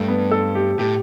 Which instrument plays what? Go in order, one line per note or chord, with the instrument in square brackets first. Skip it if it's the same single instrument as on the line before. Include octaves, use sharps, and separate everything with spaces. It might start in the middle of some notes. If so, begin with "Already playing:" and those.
Already playing: [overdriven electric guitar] G2 [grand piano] A3
[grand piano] B3
A4
G4
[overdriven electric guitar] A2 [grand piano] G4